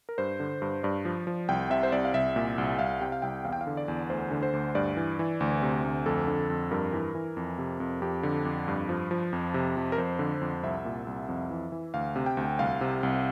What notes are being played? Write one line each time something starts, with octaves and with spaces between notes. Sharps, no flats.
A#4
G2 C5
D3
G2
G2 D5
F3
F3
C2 G5
C3 E5
C5
C2 D5
F5
C2 E5
A#2
C2
C2 F5
C3 G5
F5
C2 G5
E2 F5
G5
F5
D3
D5
E2
D2 C5
D3
C5
D2
G2 D5
E3
E3
D2
C3
D2
F2 A4
D3
F2
G2 A#4
E3
E3
F2
C3
F2
F2 G4
D3
F2
G2
F3
F3
F2
C3
F2
A#4
F2 C5
D3
F2
C2 E5
A#2
C2
F2
E3
E3
D2 F5
C3
G5
D2
C2 F5
C3
C2